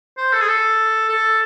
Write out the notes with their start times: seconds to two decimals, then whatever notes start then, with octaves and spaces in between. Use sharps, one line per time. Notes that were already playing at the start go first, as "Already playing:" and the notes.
0.17 C5
0.33 A4
0.41 G#4
0.48 A4
1.09 A4